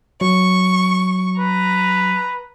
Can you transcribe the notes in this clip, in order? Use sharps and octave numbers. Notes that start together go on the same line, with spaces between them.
F#3 C#6
B4 A#5